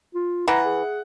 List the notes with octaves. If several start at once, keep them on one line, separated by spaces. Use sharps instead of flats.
F4
E3 F#5 A#5
G#4